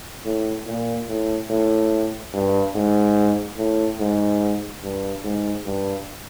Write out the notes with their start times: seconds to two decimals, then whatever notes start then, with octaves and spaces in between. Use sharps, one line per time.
0.25 A2
0.66 A#2
1.08 A2
1.50 A2
2.34 G2
2.75 G#2
3.58 A2
4.00 G#2
4.83 G2
5.24 G#2
5.66 G2